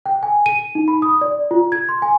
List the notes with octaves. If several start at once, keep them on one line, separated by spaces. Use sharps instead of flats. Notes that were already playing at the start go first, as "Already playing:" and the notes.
G5
G#5
D#7
D#4
B5
D#6
D5
F4
G#6
C6
G#5